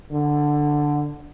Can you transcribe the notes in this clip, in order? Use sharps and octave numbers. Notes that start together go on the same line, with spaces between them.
D3